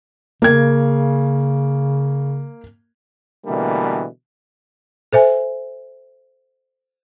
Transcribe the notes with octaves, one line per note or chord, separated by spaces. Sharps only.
C#3 A#3 G#6
B2 D3 E3 G3 A3 A#3
A4 C5 E5 G#5